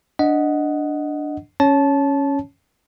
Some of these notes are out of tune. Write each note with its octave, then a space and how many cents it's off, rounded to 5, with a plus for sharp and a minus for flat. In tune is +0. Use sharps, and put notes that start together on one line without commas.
D4 +0 D#5 +0 F#5 +0
C#4 +0 C#5 +0 A5 -20